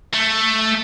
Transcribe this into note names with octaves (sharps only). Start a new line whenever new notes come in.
A3